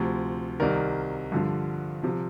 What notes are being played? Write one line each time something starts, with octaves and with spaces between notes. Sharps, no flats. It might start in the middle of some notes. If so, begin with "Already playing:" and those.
Already playing: D2 C3 F3
C2 C3 D#3 A#4 D5
G2 D3 F3
C3 F3